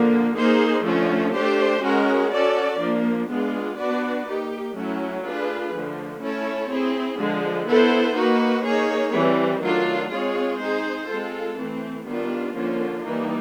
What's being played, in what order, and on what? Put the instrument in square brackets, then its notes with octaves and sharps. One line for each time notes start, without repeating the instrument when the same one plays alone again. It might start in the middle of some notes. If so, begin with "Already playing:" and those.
Already playing: [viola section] D3 F3 A#3
A#3 D#4 G#4 C5
D3 F3 A3 C#4
A3 D4 G4 C5
G#3 C#4 F#4 A#4
C#4 F#4 A4 D5
F3 A#3 D4
G#3 B3 D4 F4
B3 D4 F#4 B4 D5
A#3 D#4 G4
F#3 A3 C#4 E4
A3 D4 F4 G#4 B4
D3 F3 A3
A3 C#4 E4 A4 C#5
C4 E4 G#4
D3 F3 G#3
B3 E4 A4 C5
A#3 D#4 F#4 B4
A#3 D#4 G#4 C#5
E3 G3 C4
D#3 F#3 A3 D4 F4
G#3 C4 F4 G#4 C#5
C4 D#4 G#4 C5
G#3 C4 F4 A4
E3 A3 C4
D#3 G3 B3 D4 F4
D3 F3 A#3 C#4 F4
E3 G3 A#3 D#4